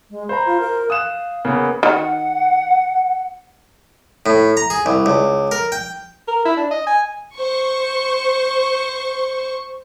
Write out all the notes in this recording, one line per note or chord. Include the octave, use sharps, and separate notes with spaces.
G#3
C5 A#5 B5
F4
A#4
F5 D#6 F#6 E7
C#3 A#3 B3
D#3 F#5
A2
A#5
G#4
C2
C#2
A#4
G5
A#4
E4
D4
D#5
G#5
C5 C#6